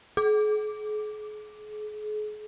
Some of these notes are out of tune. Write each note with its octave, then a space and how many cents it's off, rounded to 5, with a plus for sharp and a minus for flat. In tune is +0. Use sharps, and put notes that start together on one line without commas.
G#4 +40